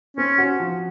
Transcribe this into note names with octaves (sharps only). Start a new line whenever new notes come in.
C4 C#4
F#4
F3